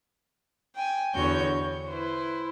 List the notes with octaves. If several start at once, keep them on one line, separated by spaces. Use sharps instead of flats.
G5 G#5
E2 D3 F#4 C#5 C#6 G6
C#5
E4 B4 C5